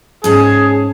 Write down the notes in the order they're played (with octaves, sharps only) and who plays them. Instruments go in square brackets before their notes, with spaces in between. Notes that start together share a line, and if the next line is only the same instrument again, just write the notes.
[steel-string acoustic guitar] G#2 C#4 A5 [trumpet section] G#4